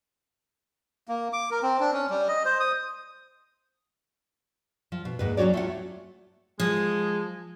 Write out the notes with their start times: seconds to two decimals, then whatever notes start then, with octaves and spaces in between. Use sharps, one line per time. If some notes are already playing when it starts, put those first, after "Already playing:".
1.08 A#3
1.33 D6
1.51 A#4
1.62 C4
1.80 D4
1.93 C#4
2.10 G3
2.28 D#5
2.45 C5
2.60 D#6
4.92 F3
5.05 B2
5.19 D#2 G#2 B4
5.37 F#3 C#4 F#4 C#5 D5
5.54 A3 F4 F#5
6.60 F3 G#3